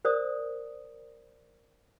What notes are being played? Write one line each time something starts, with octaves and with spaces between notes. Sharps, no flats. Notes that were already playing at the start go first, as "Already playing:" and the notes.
A#4 C5 D5 D#6